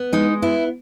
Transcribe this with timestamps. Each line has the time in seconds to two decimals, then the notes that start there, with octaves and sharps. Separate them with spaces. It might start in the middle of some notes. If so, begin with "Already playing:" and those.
Already playing: B3
0.13 G#3 D#4
0.42 B3 E4